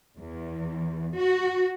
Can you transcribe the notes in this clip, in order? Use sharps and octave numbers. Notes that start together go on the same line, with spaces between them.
E2
F#4